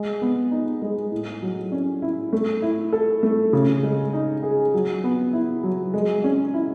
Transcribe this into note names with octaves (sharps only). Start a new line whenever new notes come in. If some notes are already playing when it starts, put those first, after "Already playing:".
Already playing: G#3
B3
D#4
G#3
A2
F#3
C#4
E4
A3
E4
A4
A3
C#3
G#3
D#4
G#4
F#3
B3
E4
F#3
G#3
C#4
E4